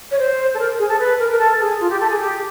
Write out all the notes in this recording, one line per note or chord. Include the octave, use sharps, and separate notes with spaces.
C#5
C5
A4
A#4
G#4
A4
B4
A#4
A#4
A4
G#4
F4
G4
A4
G#4
G4